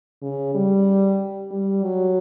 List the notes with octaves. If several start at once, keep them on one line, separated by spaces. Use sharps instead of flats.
C#3
G3
G3
F#3